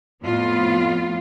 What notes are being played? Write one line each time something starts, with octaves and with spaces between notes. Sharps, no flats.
F2 A2 B3 F4